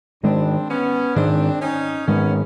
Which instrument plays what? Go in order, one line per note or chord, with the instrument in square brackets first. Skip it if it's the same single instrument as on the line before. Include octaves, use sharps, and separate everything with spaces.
[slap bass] G#2 D#3 G#3 [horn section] C4 D4
[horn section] B3 C#4
[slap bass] G#2 D#3 G#3 [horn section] C4 D4
[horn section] C#4 D#4
[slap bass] G#2 D#3 G#3 [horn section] B3 C#4